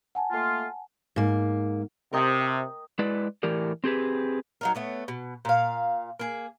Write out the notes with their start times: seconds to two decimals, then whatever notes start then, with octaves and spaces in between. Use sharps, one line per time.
0.15 F#5 G#5 A5
0.32 A3 A#3 F4
1.16 G#2 A#3
2.13 C3 A#4 D#5 G5
2.99 G#3 E4 B4 D5
3.43 A2 E3 G4 A#4 D5
3.84 C4 G4 G#4 B4
4.61 F#3 D#4 A#4
4.75 A3 B3 C#5
5.08 B2
5.45 A#2 F5
6.19 A#3 G#4